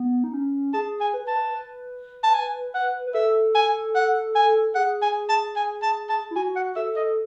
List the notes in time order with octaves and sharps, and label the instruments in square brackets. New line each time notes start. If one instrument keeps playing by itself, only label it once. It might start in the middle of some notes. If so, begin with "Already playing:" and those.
Already playing: [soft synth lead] B3
D#4
C#4
[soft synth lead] G#4 [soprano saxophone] A5
[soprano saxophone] G#5
[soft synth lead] B4
[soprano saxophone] A5
[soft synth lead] B4
B4
[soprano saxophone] A5
G#5
F#5
[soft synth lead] B4
[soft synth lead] A4 [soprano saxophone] E5
[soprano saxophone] G#5
F#5
G#5
[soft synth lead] G#4 [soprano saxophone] F#5
[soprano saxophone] G#5
A5
G#5
A5
A5
[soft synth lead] E4
[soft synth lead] F#4 [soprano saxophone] G#5
[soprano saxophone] F#5
[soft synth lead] A4 [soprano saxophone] E5
[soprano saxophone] D#5